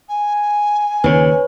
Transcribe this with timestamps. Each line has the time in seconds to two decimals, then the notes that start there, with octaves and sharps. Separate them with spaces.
0.08 G#5
1.04 D#2 C#3 B4 C#5